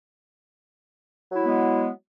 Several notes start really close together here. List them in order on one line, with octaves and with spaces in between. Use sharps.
F#3 E4 G#3 B3